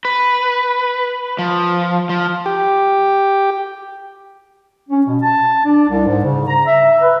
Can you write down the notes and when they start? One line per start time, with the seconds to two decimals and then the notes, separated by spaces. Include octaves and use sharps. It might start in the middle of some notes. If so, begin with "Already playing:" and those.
0.05 B4
1.38 F3
2.09 F3
2.46 G4
4.89 C#4
5.06 B2
5.22 A5
5.65 D4
5.88 C2
6.06 G#2
6.24 C#3
6.47 A#5
6.65 E5
7.02 B4